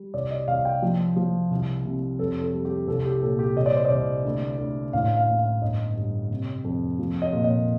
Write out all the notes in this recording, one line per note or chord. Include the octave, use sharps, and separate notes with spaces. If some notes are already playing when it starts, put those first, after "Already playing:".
Already playing: G3
C2 D5
D#5
C2 F5
G5
F3
F3
C2
C3
F2 A4
A4
G3
G4
C2 A4
G4
A#2 A4
G4
C2 D#5
D5
C5
D5
C2
D2
D2
A1 F5
F5
A1
F5
G1 D#5
G2
C3
F2
F3
D#5
A#2
D#5